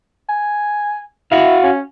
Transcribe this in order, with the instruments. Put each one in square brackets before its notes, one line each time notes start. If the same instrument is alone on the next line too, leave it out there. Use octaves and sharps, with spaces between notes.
[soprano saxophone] G#5
[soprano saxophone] E4 [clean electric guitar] F#4 F5
[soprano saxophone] C#4